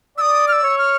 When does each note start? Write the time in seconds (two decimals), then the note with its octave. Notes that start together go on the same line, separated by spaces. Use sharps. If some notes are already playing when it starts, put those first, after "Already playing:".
0.18 D5 D#6 E6
0.48 F6
0.53 E6
0.63 C#5
0.78 F6